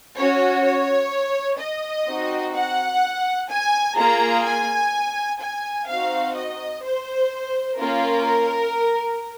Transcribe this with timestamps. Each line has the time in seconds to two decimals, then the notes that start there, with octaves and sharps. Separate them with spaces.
0.16 C#4 F#4 C#5
0.64 C#5
1.59 D#5
2.07 C4 D#4 F#4
2.54 F#5
3.50 G#5
3.97 A#3 F4 G#4 A#5
4.45 G#5
5.41 G#5
5.88 C4 D#4 F#4 F5
6.36 D#5
6.84 C5
7.79 A#3 C#4 F4 A#4